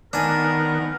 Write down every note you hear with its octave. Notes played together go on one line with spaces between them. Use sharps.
D#3 B3 D4 A#4 G#5